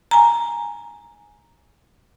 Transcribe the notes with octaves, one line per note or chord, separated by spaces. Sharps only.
G#5 A#5